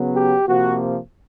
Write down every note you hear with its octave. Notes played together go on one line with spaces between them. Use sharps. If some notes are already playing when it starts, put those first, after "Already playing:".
Already playing: C#3 F#3 B3
G4
C3 F3 A#3 F#4